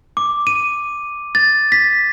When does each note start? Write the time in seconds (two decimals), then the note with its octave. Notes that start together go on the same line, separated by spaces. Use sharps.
0.17 D6
0.47 D#7
1.35 A6
1.72 B6